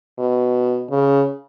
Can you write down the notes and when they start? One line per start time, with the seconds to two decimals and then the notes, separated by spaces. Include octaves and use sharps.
0.19 B2
0.90 C#3